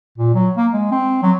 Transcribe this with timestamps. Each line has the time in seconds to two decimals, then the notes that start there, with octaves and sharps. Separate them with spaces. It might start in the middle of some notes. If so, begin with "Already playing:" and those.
0.18 A#2
0.35 F#3
0.57 A#3
0.73 G#3
0.91 C4
1.23 F#3